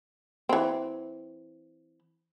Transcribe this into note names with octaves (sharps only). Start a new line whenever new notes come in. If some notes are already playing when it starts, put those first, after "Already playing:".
E3 C4